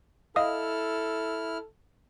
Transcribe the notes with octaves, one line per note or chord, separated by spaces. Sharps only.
E4 A4 D#5 F5 D#6 F6